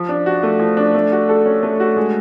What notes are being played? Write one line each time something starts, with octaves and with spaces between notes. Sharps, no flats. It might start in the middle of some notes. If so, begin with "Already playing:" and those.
Already playing: F3
D4
F#4
A3
F3
D4
A3
F#4
A4
C#4
A3
F#4
G#3